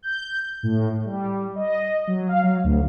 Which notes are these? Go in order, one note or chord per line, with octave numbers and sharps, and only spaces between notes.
G6
A2
G3
D#5
F#3
F5
F#3
D2